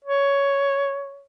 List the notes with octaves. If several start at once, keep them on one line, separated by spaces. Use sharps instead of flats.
C#5